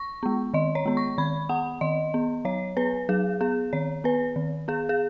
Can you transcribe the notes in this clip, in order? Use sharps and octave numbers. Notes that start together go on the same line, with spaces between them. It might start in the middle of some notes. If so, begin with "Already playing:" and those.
Already playing: C#6
G#3 B3
D#3 D#5
C#5
G#3 B3
C#6
D#3 B5
B3 F#5
D#3 D#5
B3
F#3 C#5
B3 B4
F#3 G#4
B3 G#4
D#3 C#5
B3 B4
D#3
B3 G#4
G#4